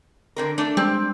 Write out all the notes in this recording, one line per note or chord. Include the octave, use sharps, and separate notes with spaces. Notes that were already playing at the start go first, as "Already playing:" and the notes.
D3 C4 A#4
A3 D4
G3 G#3 C4 D4 G4